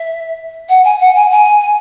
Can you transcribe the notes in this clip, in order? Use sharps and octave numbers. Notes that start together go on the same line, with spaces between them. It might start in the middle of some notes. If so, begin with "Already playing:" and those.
Already playing: E5
F#5
G#5
F#5
G#5
G#5